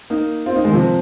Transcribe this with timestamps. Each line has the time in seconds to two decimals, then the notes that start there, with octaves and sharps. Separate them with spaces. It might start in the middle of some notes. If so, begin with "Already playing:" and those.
0.10 A#3 D#4
0.46 C4 F4
0.56 A#3 D#4
0.65 D#3 G#3
0.73 C3 F3